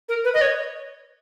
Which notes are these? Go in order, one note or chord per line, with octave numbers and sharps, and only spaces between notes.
A#4
B4
D#5
C#5